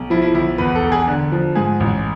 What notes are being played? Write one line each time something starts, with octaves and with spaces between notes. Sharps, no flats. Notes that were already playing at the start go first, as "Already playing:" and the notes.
Already playing: B1
F3 E4
E4
B1 E4
E2 B4
A4
E1
G#4
D3
F3
G#2 G#4
A1